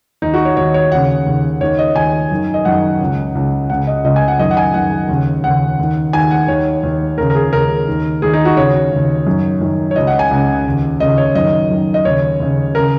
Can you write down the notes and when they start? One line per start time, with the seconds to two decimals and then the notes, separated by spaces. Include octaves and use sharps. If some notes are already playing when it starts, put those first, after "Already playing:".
0.22 D#2 D#3 D#4
0.34 F#4
0.45 C#5
0.57 D#2 D#3 C#5
0.74 C#5
0.92 D#2 C#3 F#5
1.26 D#2 C#3
1.61 D#2 D#3 C#5
1.79 D#5
1.96 D#2 D#3 G#5
2.31 F#2 D#3
2.54 D#5
2.65 F#2 D#3 F#5
3.00 C#2 C#3
3.35 C#2 C#3
3.70 C#2 C#3 F#5
3.87 D#5
4.04 C#2 C#3 D#5
4.16 G#5
4.28 F#5
4.39 F#2 D#3 D#5
4.51 F#5
4.57 G#5
4.74 F#2 D#3 F#5
5.09 D#2 C#3
5.44 D#2 C#3 F#5
5.79 D#2 D#3
6.13 D#2 D#3 G#5
6.31 F#5
6.48 D#2 D#3 C#5
6.83 D#2 D#3
7.18 D#2 C#3 A#4
7.30 A#4
7.35 G#4
7.53 D#2 C#3 A#4
7.87 D#2 D#3
8.22 D#2 D#3 G#4
8.33 D#4
8.45 F#4
8.57 D#2 C#3 C#5
8.92 D#2 C#3
9.27 F#2 D#3
9.61 F#2 D#3
9.91 C#5
9.96 C#2 C#3 D#5
10.07 F#5
10.19 G#5
10.31 C#2 C#3
10.66 D#2 C#3
11.00 D#2 C#3 D#5
11.18 C#5
11.35 F#2 D#3 D#5
11.70 F#2 D#3
11.94 D#5
12.05 D#2 C#3 C#5
12.40 D#2 C#3
12.75 C#3 A#4